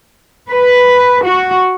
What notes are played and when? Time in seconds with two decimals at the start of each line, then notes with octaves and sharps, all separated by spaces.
0.50 B4
1.24 F#4